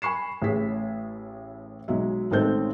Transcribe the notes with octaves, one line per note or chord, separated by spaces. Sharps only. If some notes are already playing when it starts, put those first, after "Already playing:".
G#5 B5 C#6 C7 E7
A1 A2 G#4 B6
B1 F#3 G#3 E5
A1 D#3 G#3 C4 A4 G6